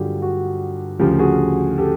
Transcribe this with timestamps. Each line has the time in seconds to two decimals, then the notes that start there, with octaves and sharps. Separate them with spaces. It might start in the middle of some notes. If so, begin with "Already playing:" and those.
Already playing: G2 D3 F#3 F4 G4 G#4
0.22 F#4
0.99 D2 C#3 F3 F4 G4
1.19 F#4 G#4
1.78 G4 A4